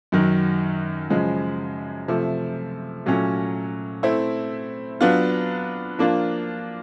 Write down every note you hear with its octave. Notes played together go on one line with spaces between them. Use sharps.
F#2 D#3 F#3
F#2 C#3 F3 G#3
C3 F3 A3
A#2 F#3 A3 C#4
A3 C4 E4
F#3 B3 D4 F4
F3 A#3 D4 F4